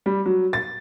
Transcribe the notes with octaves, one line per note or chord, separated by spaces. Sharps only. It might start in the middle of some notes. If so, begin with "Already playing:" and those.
G3
F#3
A6